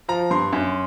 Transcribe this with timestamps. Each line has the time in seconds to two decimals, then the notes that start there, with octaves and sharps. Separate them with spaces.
0.09 F3 A#5
0.31 G2 C6
0.53 F#2